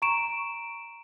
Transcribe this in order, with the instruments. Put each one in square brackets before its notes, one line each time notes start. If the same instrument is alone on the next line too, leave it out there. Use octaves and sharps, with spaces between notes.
[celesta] A#5 C#6 D7 E7